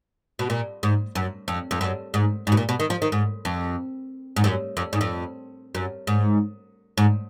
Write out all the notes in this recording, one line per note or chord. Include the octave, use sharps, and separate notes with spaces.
B2
A#2
G#2
F#2
F2
F2
F#2
G#2
G#2
B2
A#2
B2
D#3
F3
D#3
G#2
F2
G#2
F#2
F2
G#2
F2
F#2
G#2
G#2